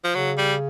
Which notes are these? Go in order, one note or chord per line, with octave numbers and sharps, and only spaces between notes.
F3
C#3 F#3
G3